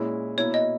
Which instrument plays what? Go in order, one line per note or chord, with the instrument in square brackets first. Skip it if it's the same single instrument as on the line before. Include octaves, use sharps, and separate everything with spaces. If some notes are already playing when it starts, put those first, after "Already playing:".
Already playing: [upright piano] A#2 G#3 C#4 E4
[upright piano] B2 A#3 E4 [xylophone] C#5
[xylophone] D#5